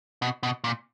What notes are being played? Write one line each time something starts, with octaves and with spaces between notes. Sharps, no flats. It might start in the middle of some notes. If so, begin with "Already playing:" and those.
B2
B2
A#2